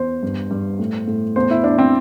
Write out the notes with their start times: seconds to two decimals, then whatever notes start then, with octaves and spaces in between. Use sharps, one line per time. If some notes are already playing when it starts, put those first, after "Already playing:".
Already playing: E2 C5
0.23 G2
0.51 G2
0.79 A2
1.07 A2
1.36 E2 C5
1.51 E4
1.64 E2 D4
1.78 C4